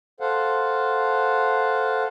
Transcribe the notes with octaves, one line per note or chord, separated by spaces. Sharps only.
A4 C5 F5 F#5